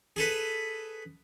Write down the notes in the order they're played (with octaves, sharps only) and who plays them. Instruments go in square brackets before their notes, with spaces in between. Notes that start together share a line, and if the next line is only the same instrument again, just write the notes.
[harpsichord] G#4 A4 B4